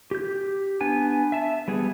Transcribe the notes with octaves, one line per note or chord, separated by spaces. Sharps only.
G4 G6
B3 D4 G#5
E5 A5
G3 B3 G#4